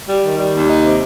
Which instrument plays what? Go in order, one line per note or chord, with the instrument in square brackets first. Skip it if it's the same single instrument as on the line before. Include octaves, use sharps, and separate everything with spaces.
[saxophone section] G3
D#3
G3
D#2
D#4
C3